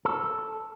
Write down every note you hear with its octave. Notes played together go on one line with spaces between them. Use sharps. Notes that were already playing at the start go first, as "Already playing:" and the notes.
A4